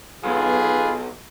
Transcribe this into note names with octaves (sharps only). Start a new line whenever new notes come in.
B1 F4 G#4 B4 B5